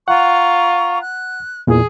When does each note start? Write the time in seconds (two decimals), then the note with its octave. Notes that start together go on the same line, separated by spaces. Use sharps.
0.08 F4 F#5 A#5 C#6
1.01 F#6
1.67 E2 A#2 E3 G#4